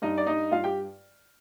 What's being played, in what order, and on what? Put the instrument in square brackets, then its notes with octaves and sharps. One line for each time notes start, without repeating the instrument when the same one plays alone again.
[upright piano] G2 D#4 D#5
D5
G2 D#4 D#5
G2 F4 F5
G4 G5